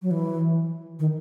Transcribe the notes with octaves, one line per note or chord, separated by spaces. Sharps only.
F#3
E3
D#3